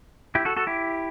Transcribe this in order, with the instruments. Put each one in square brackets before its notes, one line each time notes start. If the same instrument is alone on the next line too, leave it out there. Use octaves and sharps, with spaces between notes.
[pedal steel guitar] E4 G4
F#4 A4
F#4 A4
E4 G4